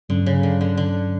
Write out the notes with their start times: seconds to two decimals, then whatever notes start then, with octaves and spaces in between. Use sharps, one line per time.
0.09 G2 D3 F#3 C#4
0.26 C#3
0.43 D3
0.61 D3
0.77 D3